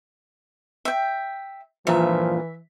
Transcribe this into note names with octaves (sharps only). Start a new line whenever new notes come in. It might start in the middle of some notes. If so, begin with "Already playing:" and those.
E5 G5
G2 A#2 E3 F3 E5